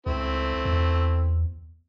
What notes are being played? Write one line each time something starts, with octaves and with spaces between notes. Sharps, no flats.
C#2 A3 C4 E4
E2